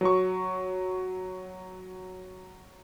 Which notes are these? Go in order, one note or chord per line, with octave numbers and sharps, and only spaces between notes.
F#3 C#6